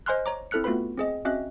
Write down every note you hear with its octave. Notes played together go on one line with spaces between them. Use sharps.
C5 D#5 G#5 C6 F6 F#6
C#5 A#5 D6
C4 E4 A4 F6 F#6 C#7
A3 B3 F4 F#4 B4 B5
C4 G#4 D#5
C4 C#4 F#4 D#5 E5 F#6